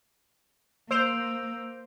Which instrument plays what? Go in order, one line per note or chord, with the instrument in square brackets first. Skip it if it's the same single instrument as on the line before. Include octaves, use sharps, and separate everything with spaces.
[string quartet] A#3 [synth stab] C5 [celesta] E6 D7 F7